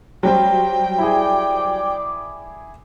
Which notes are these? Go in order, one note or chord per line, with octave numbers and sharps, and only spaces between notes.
F#3 G3 C5 G5
E4 G#4 D5 D6